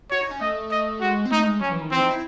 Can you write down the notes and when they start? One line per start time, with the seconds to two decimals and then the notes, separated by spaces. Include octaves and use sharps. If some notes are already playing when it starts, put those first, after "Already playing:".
0.11 F#4 C#5
0.21 D#4
0.31 C#4
0.41 A3 D#5
0.71 D#5
1.01 G#3 F#4
1.25 C4
1.31 A3 D#4
1.46 G#3
1.61 F#3 C#4
1.71 E3
1.81 D#3
1.91 E3 C4
2.01 D#4
2.11 E4